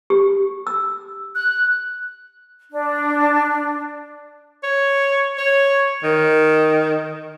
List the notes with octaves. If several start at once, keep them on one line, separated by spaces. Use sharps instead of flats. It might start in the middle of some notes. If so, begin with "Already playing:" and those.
G4
E6
F#6
D4
C#5
C#5
D#3